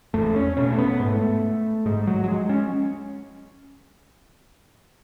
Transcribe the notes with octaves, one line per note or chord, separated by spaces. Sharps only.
E2 A3
C#4
B2 C#4
A3
B3
G#2 A3
G#2 G#3
F#3
F#3
G#3
C#4